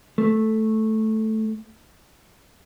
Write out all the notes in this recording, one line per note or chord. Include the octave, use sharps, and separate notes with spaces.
A3